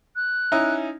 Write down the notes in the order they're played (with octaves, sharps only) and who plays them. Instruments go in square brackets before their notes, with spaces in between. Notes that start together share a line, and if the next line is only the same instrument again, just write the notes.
[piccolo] F#6
[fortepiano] C#4 D#4 E4